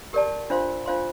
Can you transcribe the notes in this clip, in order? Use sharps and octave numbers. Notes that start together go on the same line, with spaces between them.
G4 A#4 D5 A5
D4 F4 C5 F5 C6
D4 F4 C5 F5 C6